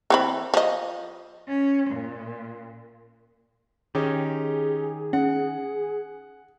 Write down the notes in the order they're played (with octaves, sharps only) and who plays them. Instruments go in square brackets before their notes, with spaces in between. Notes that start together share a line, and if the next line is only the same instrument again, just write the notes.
[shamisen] E3 C4 B5
F3 D#5
[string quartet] C#4
A#2
[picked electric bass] D#3 [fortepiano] C#4 D#4 G4 [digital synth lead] G#4
[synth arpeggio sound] C#4 [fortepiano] F#5